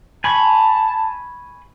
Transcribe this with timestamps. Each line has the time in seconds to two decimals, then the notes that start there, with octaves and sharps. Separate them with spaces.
0.24 G#5 A5 B5 C#6